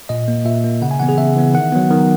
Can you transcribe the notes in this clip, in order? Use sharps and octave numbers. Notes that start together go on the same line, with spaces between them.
A#2 D#5
A#3
A#2 E5
A#3
C#3 F#5
G#5
E3 B3 F#5
G#4
C#3 E5
E3 B3
D#3 F#5
F#3 B3
D#3